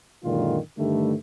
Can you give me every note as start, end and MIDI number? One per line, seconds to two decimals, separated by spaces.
0.24 0.58 42
0.24 0.58 46
0.24 0.58 50
0.24 0.58 51
0.24 0.58 56
0.24 0.58 65
0.78 1.14 43
0.78 1.14 50
0.78 1.14 51
0.78 1.14 55
0.78 1.14 57